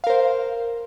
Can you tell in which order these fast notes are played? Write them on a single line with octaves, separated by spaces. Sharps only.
F5 A#4 C5